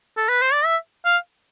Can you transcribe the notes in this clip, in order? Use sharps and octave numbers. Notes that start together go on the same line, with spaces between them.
A4
B4
C5
D5
E5
F5